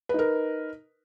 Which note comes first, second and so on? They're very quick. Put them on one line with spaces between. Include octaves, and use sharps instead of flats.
B4 D#4 A#4